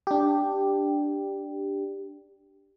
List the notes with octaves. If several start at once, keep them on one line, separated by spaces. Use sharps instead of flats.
D4 G4